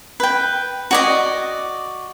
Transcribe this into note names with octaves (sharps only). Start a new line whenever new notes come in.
B4 G5
F#4 D5 D#5